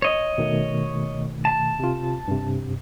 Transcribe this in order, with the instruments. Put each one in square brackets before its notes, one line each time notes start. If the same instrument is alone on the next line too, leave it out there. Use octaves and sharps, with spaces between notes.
[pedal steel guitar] C#5 D#5
[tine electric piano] B2 D#3 A3
[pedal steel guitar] A5
[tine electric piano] C3 F4
G2 C3